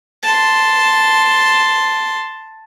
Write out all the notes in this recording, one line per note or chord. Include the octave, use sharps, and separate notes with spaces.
A5 C6